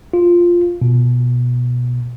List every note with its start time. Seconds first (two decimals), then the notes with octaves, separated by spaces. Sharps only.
0.13 F4
0.81 B2